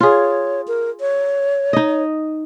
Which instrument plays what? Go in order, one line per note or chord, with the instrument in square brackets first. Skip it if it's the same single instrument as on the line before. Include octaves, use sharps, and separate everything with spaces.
[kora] F4 G#4 [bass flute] C#5
[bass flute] A#4
C#5
[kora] D#4 D#5